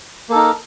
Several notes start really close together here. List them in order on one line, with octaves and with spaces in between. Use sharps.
A#3 A4 D#4 A#4